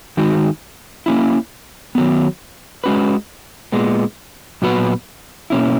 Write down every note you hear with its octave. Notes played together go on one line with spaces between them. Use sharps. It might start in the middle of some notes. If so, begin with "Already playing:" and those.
D#3 G#3 D#4 F#4
A#3 C#4 E4
D#3 F#3 B3
G#3 C#4 F#4 B4
A#2 G#3 B3
A#2 F#3 B3 F#4 B4
B2 A#3 C#4 E4